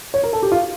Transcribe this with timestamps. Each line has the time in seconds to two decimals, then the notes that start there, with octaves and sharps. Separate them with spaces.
0.14 C#5
0.23 A#4
0.33 A4
0.43 G4
0.52 F4